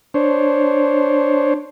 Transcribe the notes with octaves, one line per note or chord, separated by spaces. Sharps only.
D4 C5 C#5